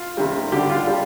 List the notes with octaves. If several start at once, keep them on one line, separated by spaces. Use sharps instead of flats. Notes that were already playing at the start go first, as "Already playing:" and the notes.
Already playing: F4
C3 D#3 G3
D3 G3 G4
F4
G3 D4